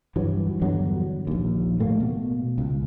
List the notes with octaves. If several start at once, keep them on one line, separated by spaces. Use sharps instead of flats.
G2 E3 F#3
E2 G2 D3 F#3
A#1 D#2
A2 A3 A#3
B2
C#2